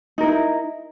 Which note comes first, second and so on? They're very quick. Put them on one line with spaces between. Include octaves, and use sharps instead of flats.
D#4 A#4 E4